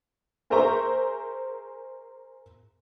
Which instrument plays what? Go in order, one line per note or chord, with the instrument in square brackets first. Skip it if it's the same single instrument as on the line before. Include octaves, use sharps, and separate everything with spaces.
[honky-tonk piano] G#4 A#4 C5 E5 A#5 C#6